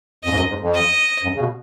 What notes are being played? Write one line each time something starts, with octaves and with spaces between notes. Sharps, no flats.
F2 D#5
G#2
F#2
G#2
F2
D#5
F#2
C#3
B2